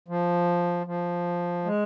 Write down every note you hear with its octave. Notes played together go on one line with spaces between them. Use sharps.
F3
F3
G#3